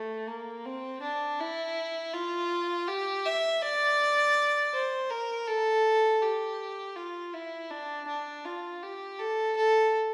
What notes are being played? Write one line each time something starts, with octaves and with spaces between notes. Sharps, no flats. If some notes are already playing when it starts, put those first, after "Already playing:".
Already playing: A3
A#3
C4
D4
E4
F4
G4
E5
D5
C5
A#4
A4
G4
F4
E4
D4
D4
F4
G4
A4
A4